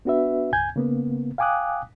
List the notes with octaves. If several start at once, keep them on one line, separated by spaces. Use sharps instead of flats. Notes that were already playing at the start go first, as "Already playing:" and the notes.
B3 D4 F#4 B4 E5
C#2 G2 G#5 G6 G#6
C#3 A#3 B3
F5 G5 G#5 D6 D#6 F#6